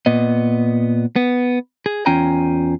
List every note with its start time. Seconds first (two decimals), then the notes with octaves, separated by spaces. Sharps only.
0.06 A#2 B3 D#5
1.16 B3
1.86 G#4
2.06 E2 C#4 F4 G5 G#5 A#5